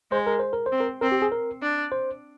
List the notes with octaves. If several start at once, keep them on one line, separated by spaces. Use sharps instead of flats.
G#3 C5
A#4
C5
A#4
C5
C4
A#4
C4 A#4
G4
G#4
A#4
D4
C5